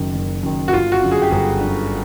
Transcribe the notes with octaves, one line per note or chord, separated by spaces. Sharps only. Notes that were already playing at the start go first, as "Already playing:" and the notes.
Already playing: F#1 F#2 D#3
F#1
F#2 D#3
F#4
G1 F4
F#4
F#2 D3
G#4
G4
G1 G#4
F#2 D3